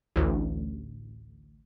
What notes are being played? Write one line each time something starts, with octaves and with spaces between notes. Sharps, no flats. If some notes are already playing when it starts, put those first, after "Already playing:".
A1 D2